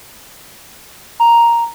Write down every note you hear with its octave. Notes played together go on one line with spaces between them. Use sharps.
A#5